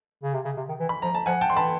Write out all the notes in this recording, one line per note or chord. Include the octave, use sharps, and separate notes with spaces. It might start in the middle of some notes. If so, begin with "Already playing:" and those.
C#3
C3
C#3
C3
D#3
E3
B5
F3 A#5
A5
F3 F#5 G#5
G5 A5
E3 C6
A5 B5